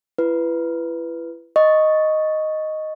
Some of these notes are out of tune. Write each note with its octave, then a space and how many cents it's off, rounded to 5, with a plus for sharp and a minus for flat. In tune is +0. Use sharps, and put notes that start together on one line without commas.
E4 +35 B4 +0
D#5 +0 C#6 +0